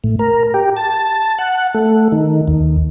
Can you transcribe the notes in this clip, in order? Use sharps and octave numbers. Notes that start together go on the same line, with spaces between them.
A2
A#4
G4
A5
F#5
A3
D#3
D#2